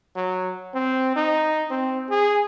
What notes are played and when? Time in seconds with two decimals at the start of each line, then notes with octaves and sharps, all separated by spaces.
0.16 F#3
0.75 C4
1.16 D#4
1.71 C4
2.10 G#4